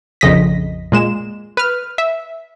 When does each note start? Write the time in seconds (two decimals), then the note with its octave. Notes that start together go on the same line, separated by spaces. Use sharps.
0.21 A#1 F2 C#3 D#5 A#6 B6
0.92 A#2 G#3 E7
1.57 B4 F6
1.98 E5